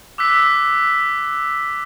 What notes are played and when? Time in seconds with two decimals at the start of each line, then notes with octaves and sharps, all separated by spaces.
0.18 D6 E6 F#6 B6